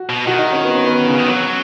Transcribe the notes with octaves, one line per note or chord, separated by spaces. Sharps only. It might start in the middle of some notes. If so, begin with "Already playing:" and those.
Already playing: F#4
B2
D#3 F#4
D#4
C#4
B3
C#4
B3
C#3
D#3
F#3 C#4